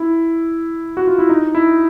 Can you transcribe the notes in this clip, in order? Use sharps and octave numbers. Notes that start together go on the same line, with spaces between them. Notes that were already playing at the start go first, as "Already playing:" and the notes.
Already playing: E4
F#4
F4
E4
D#4
E4